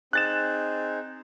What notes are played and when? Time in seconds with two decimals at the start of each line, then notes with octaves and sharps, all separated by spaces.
0.13 C4 D#4 G#4 F#6 A6 E7